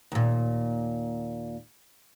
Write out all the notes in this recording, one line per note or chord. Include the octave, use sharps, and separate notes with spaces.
D#2 A#2